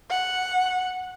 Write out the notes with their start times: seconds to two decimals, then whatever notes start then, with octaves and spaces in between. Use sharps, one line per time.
0.10 F#5